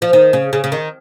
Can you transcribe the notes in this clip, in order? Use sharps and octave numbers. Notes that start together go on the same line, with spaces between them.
F3
D#3
C#3
C#3
C#3
D#3